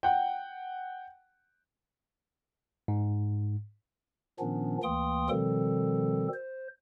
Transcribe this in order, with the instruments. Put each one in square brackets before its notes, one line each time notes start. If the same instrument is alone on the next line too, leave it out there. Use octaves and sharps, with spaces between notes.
[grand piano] F#5 G5
[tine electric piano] G#2
[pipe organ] A#2 D#3 F3 B3 C#4 D4
D2 E3 A#3 G5 C6 D#6
B2 D#3 F3 G3 C4 A4
C5